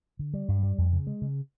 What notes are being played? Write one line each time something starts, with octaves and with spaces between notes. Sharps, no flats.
D3
G3
G2
G3
F2
C#3
G#3
C#3